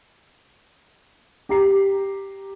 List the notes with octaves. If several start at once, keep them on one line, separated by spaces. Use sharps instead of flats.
G4 A#5 C7